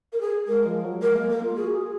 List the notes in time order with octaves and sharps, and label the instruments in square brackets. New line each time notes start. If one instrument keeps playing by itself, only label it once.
[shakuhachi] A#4
G#4
[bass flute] G#3 [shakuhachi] A#4
[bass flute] F3
F#3
[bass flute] G#3 [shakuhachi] A#4
[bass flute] A#3
[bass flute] A#3 [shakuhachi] A#4
[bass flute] F4
[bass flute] F#4 [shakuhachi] G#4
[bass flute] G#4